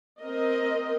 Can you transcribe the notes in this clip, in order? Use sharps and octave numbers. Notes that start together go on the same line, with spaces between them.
C4 A#4 D#5